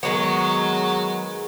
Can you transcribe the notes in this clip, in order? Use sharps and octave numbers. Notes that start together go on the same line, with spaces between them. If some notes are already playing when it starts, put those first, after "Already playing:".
D#3 F#3 G#3 B3